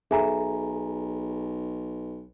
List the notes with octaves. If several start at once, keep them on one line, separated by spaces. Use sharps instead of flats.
B1 G#4 A4 E5 G#5 A#5